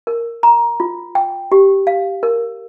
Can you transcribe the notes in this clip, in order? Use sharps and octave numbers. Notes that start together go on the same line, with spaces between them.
A#4
A#5
F4
G5
G4
F5
A#4